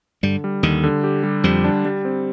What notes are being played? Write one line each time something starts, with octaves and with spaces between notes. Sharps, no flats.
G2 D3 G3
G3
D#2 D3 D#3
D3
G4
G3
F2 F3 G3
D4
G3
C4